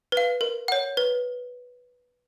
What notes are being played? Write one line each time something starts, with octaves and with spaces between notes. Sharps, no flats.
B4 F5
A#4
C#5 F#5
B4